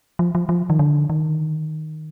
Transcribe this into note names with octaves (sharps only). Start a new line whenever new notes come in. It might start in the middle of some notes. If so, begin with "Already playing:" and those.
F3
F3
F3
D#3
D3
D#3